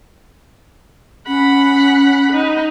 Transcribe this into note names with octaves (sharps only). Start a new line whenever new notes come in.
C#4 F#5 B5
D#4